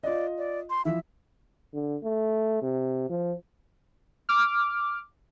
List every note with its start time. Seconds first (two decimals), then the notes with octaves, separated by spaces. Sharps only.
0.04 F4 D5 D#5
0.38 D5
0.70 C6
0.85 E3 F3 E5
1.74 D3
2.03 A3
2.62 C3
3.09 F3
4.29 D6 F6